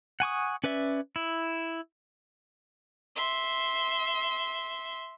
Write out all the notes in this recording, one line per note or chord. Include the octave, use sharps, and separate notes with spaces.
F#5 G#5 C#6 D#6
C#4 B4 D5 E5
E4
E5 C6